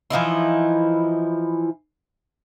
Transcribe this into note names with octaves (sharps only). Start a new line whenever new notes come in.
E3 F3 D#4 E4